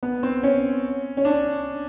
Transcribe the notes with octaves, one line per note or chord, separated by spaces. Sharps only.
B3
C4
C#4
C#4
D4